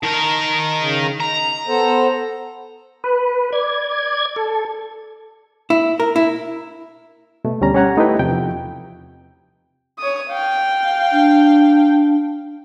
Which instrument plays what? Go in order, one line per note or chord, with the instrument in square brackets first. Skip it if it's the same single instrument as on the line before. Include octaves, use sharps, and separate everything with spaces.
[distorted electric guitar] D#3 A#4 [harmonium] A5
[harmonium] C#3
[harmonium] D#4 [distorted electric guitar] A#5
[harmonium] B3 A4 C5
[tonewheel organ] B4
D5 G#6
A4
[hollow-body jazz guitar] E4
A#4
E4
[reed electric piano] B2 A3
D2 G3 C#4 A#5
C#4 G4 C#5 F#5 G#5 A#5
A3 D#4 E4 G4 B4 G5
E2 C3 F3 G5
[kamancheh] C#5 D#6
F5 G5
[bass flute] D4